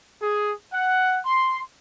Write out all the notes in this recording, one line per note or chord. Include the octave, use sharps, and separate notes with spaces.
G#4
F#5
C6